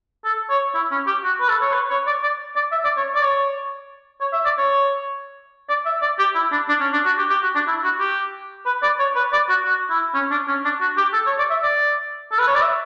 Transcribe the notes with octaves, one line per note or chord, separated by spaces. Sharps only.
A4
C#5
E4
C#4
G4
F#4
B4
A4
C#5
B4
C#5
D5
D5
D5
E5
D5
C#5
D5
C#5
C#5
E5
D5
C#5
D5
E5
D5
G4
E4
D4
D4
C#4
D4
F#4
G4
G4
F#4
D4
E4
F#4
G4
B4
D5
C#5
B4
D5
F#4
F#4
E4
C#4
D4
C#4
D4
F#4
G4
A4
C#5
D5
E5
D5
A4
B4
C#5
D5
E5